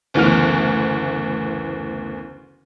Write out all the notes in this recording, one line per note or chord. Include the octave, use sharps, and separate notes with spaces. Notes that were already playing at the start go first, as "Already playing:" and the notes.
F#1 D2 E3 B3 F6